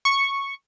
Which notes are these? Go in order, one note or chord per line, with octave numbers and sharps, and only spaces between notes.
C#6